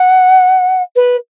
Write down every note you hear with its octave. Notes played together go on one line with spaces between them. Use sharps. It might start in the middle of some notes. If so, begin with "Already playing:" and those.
Already playing: F#5
B4